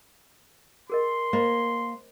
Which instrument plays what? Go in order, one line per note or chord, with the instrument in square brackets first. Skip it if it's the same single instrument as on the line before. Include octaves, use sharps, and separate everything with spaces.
[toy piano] G#4 A#4 D#5 [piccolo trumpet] C6
[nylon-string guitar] A#3 [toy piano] C5 D#5 B5